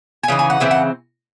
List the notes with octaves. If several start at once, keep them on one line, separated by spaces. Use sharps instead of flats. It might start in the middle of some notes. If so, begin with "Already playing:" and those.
G#5
C#3 E3 D#4
G#5
F#5
C#3 E3 C4 E5
F#5